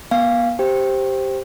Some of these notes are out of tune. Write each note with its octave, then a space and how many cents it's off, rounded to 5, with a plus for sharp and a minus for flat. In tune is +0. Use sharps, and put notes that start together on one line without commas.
B3 -40 F5 +0 G#5 -30
G4 +0 C5 +0 G5 +0